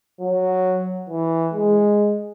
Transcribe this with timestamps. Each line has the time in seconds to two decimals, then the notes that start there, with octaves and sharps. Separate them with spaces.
0.20 F#3
1.09 E3
1.53 G#3